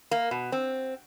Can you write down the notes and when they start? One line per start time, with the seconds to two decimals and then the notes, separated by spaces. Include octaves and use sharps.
0.11 A#3
0.31 B2
0.52 C4